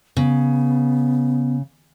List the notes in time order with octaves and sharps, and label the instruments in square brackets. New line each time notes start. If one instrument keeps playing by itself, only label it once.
[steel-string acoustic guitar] C#3 [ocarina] B3